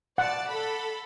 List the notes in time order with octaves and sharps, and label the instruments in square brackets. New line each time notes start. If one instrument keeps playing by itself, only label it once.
[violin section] D5 A5 [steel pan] F#5
[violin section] A4 B5